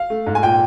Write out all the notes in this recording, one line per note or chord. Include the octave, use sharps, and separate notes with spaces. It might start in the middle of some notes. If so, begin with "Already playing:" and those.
Already playing: F5
A3
G#2
G#5
A#2 G5